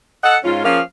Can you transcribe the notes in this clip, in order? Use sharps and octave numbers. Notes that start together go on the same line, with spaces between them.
A4 D#5 F#5
G#2 C#4 F4
F3 A#3 C#4 G#4 F5